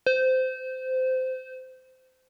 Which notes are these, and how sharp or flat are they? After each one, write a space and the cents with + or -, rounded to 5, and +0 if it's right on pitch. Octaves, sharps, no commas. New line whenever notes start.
C5 -20